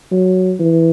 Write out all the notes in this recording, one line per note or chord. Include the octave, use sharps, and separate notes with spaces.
F#3
E3